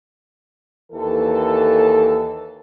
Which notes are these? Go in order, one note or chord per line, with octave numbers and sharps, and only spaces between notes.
D#2 E3 A4